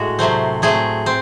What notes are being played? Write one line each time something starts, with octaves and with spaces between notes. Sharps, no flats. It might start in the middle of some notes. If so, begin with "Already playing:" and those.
Already playing: A2 G#3 F#4
C3 F#3 A3 C4
A2 F#3 A3 C4 G#4
C4